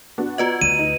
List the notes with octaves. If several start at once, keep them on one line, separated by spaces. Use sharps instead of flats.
B3 D4 F#4
B3 F4 F#4 B4 D5 D#5
D2 D#7
D#4